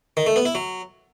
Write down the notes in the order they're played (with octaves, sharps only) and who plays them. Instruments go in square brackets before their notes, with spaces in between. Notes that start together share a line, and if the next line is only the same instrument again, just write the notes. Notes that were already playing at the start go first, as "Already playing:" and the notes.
[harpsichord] D#3
A3
B3
E4
F#3